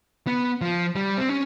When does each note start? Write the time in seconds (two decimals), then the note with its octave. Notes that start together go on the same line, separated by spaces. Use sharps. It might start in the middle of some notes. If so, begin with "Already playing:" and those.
0.27 B3
0.61 F3
0.96 G3
1.18 C4
1.29 C#4